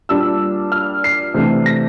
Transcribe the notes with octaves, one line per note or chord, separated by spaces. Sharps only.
A#2 G3 D4 E6
F6
C7
C3 E3 A3 D4
A#6